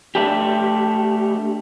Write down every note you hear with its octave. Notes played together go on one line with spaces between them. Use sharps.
A3 D4 G4